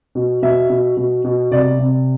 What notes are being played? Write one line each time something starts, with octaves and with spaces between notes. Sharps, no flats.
B2
B2 E5
B2
B2
B2
C3 D5
C3